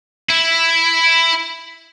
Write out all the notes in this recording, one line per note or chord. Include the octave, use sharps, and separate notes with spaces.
E4